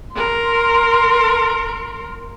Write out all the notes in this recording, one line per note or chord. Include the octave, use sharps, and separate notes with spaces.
A#4 C6